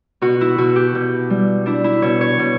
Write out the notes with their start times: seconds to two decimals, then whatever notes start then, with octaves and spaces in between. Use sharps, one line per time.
0.22 B2 F#4
0.41 E4
0.58 B2 F#4
0.76 G4
0.95 B2
1.30 G3
1.66 D4 E4
1.84 E4
2.02 B2 C#5
2.21 C#5
2.39 B2